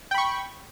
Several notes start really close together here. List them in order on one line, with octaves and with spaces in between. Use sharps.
G5 B5 C#6